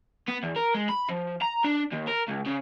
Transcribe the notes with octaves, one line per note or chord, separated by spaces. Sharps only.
B3
E2
A#4
G#3
B5
F3
A#5
D4
D#2
A#4
C#2
C#3